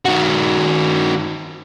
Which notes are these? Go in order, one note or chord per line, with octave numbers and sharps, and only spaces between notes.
D#3 F#4